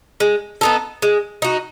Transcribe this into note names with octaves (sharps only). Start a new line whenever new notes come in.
G#3
B3 D#4 A4
G#3
D#4 F#4